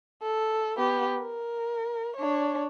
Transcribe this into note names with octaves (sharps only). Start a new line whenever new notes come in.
A4
B3 G4
A#4
D4 C#5